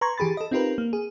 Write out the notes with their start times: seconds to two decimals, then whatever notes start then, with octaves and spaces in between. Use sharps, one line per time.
0.01 B4 A#5 C6 C#6 G#6
0.18 E3 G4 G#4 B5 A6
0.37 A4 D#5
0.51 C4 D#4 F4 G4 A#4 B4
0.78 A#3
0.93 G#4